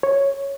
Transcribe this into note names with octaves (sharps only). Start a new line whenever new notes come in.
C#5